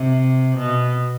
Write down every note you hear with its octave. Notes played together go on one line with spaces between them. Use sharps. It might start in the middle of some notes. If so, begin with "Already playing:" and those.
Already playing: C3
B2